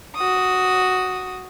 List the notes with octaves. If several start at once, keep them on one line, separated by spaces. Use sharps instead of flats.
F#4 D#6